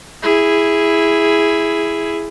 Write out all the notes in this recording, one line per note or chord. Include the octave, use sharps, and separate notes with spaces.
E4 G#4